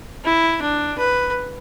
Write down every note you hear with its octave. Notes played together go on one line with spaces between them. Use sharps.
E4
D4
B4